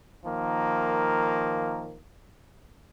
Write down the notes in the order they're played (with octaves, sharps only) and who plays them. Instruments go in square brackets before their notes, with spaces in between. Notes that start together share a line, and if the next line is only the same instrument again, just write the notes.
[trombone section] D#3 F3 A#3